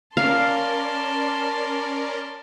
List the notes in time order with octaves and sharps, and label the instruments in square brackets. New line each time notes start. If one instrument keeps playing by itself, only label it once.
[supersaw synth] C#4 A#4 D5 [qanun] F5 [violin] A5 C6